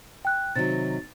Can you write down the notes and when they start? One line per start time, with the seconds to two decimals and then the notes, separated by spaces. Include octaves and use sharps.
0.25 G5 F#6
0.55 C3 D#3 F#3 A6